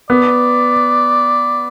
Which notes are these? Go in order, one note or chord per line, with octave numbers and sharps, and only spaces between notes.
B3 D5